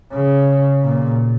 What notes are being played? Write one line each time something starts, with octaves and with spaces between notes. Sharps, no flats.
C#3
A#2